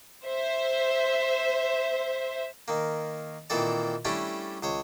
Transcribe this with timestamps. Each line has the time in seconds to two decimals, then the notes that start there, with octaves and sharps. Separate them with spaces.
0.25 C5 E5
2.68 D#3 A#3
3.50 A#2 D#3 E3 C4 A4 D5
4.05 G3 A3 C#4 D4 E4 G4
4.63 C#2 C5 C#5